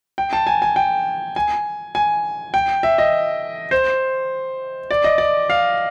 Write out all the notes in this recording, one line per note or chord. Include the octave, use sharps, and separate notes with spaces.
G5
A5
G#5
G#5
G5
G#5
G#5
G5
E5
D#5
C5
D5
D#5
D5
F5